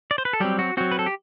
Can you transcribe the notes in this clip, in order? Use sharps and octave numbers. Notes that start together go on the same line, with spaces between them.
D5
C5
B4
A4
F#3 G3 C4 G4
F#4
F#3 C4 F#4
B4
A4
G4